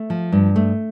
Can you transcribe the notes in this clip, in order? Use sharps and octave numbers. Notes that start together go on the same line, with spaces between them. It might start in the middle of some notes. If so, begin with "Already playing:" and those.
Already playing: A3
F3
G2
A3